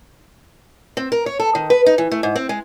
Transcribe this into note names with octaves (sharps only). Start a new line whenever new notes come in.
C4
A#4
C#5
A4
D#3
B4
D#4
E3
A3
G#2
C4
G#3